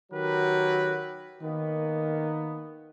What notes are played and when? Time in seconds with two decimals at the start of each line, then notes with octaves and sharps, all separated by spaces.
0.12 D#3 F#3 F#4 G4 A#4 B4
1.42 D#3 A#3 B3